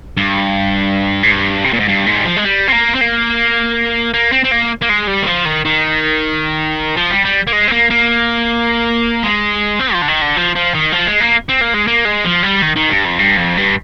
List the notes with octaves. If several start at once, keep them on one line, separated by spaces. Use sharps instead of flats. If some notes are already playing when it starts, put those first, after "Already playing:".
G2
G#2
G2
C3
A#2
G#2
G2
G#2
G3
F3
G#3
G3
C4
A#3
C4
A#3
A#3
C4
C4
A#3
A#3
G#3
G3
D#3
F3
D#3
D#3
F3
G3
G3
A#3
G#3
C4
A#3
A#3
G#3
C4
F3
D3
D#3
D3
F3
F3
D#3
F3
G#3
A#3
C4
A#3
G#3
A#3
G#3
F3
G3
D#3
D#3
G2
F2
G2
F2
G2